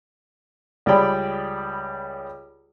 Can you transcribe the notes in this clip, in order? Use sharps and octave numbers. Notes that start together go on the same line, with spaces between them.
C#2 G3 G#4 D5 G5 B5